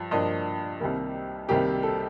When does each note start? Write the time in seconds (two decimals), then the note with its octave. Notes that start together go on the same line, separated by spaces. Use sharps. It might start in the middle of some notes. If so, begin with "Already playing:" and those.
Already playing: G2 F3
0.11 G2 F3 A#3 D4 D#5
0.80 C2 C3 D#3 G3 A#3
1.49 C2 C3 D#3 G3 A#3 G4
1.83 A4